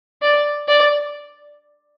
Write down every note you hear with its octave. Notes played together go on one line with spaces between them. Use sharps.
D5
D5